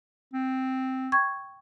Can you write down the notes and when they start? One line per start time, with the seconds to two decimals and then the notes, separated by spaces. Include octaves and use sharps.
0.34 C4
1.12 G5 C#6 G#6